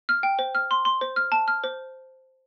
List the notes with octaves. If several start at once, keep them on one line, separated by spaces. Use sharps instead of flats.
F6
G5
C5
F6
C6
C6
C5
F6
A5
F6
C5